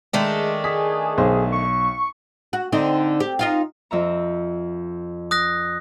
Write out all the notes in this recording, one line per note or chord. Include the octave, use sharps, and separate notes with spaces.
D#3 G#3 A3 D4
G#4 B6
B1 C5
C#6
F#4
D3 C4 D#4
G4
D#4 F4 F5
F2 E5 A#5
D#6 F#6 A#6